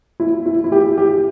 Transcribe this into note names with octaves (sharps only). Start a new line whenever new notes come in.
E4
E4
E4
G4
G4